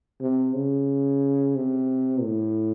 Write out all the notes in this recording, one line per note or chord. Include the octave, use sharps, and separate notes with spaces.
C3
C#3
C3
A2